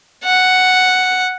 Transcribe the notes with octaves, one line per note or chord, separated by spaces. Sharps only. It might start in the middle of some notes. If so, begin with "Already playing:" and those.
F#5